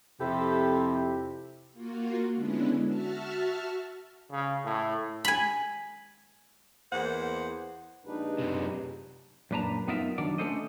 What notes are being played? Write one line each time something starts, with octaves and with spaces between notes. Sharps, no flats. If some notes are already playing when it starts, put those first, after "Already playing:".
F2 C3 E4 G4 A4
A#3 F4 F#4
D3 G#3 B3 C#4 D4 E4
F#4 E5 A5 F6
C#3
A2
G#5 B5
E2 A#3 C5 F#5
A#1 G#3 D4 D#4 G4 B4
F#2 C3
F#2 A#2 D4 B4 A5 A#5
F#2 B3 D#4 F4 A#4 E5
D#3 F#3 D4 D5
A3 C#4 D4 A4 C5 D#5